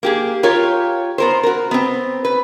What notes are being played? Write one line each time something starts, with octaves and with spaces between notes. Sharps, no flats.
A#3 G4 G#4
F4 G4 A#4 C#5
B3 A#4 C5
F#4 A#4
B3 C4
B4